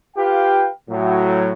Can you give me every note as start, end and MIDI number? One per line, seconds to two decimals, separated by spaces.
0.17 0.68 65
0.17 0.68 67
0.17 0.68 71
0.17 0.68 77
0.17 0.68 79
0.90 1.52 45
0.90 1.52 54